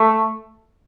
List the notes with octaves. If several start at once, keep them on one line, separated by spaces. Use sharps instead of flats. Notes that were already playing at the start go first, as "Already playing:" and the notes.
Already playing: A3